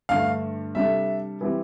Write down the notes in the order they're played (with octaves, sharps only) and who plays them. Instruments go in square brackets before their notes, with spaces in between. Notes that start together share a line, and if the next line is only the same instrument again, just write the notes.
[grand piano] G2 D3 A3 [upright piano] F5
[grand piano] C3 G3 D4 A4 [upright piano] E5
[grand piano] E3 G3 C4 G4